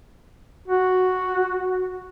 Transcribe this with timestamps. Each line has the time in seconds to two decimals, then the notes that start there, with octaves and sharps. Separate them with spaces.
0.68 F#4